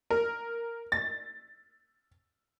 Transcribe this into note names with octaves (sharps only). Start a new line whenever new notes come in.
A#4
A6